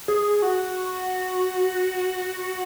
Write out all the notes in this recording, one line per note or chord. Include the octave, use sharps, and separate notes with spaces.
G#4
F#4